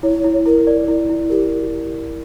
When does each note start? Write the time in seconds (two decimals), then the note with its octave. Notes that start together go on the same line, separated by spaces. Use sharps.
0.03 E4 C#5
0.24 E4
0.46 E4 A#4
0.67 D5
0.88 E4
1.09 E4
1.30 G4 A#4